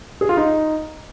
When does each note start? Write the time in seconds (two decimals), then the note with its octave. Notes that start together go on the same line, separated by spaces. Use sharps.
0.21 G#4
0.29 F4
0.37 D#4